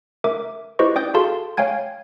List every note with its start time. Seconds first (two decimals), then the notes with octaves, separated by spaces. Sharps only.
0.24 A#4 E5 D6
0.79 E4 G4 B4 C5 D#5 C#6
0.96 D5 G5 D#6 G6
1.14 F#4 G#4 A4 F5 A5 C6
1.57 C#5 F5 G5 G#5 G#6